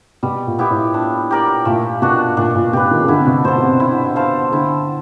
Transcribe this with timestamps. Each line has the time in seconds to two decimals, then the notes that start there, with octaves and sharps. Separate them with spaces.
0.23 B2 G3
0.47 A#2
0.58 B3 E4 G4
0.70 A2
0.94 D4
1.31 G4 A#4 D5
1.65 A#2 A3
2.02 B2 D4 F#4
2.37 A#2 D4
2.55 A#2
2.73 B2 G4 B4
2.91 D#3
3.01 C#3
3.08 D3 E4
3.18 C3
3.27 B2
3.44 B2 A4 C5
3.57 B2
3.63 C3
3.80 E4
4.16 A4 C5 F5
4.52 D3 E4